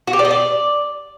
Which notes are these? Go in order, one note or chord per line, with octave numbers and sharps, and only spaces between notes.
F#4
G4
D5
D#5
D5